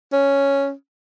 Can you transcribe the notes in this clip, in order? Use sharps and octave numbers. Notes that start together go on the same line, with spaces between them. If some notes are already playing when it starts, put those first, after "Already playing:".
C#4